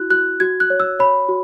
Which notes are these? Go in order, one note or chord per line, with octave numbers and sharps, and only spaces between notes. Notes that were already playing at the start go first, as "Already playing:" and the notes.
Already playing: E4 F#4 F#6
F#4 F#6
F#4 G#6
F#6
C#5
E6
C#5 B5
F#4